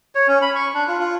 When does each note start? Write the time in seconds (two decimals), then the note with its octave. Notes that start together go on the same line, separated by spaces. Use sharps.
0.15 C#5
0.28 C#4
0.42 B5
0.55 C#6
0.74 D4
0.88 F4
0.99 F4